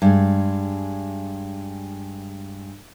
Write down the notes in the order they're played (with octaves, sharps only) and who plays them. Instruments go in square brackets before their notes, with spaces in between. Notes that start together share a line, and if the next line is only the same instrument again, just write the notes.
[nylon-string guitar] G2 G#3